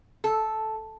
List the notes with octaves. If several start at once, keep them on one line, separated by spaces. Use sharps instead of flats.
A4